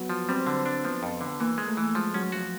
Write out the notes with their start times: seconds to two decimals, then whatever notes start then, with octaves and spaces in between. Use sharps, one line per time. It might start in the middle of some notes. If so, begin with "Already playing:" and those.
Already playing: F#3 B3
0.10 F3
0.28 G3 C4
0.47 D3
0.66 D4
0.85 F3 B3
1.03 F2
1.21 D3
1.40 E3 A#3
1.58 G#3
1.68 A3
1.77 E3
1.95 F3 G#3
2.14 F#3 C#4
2.32 F3 F#4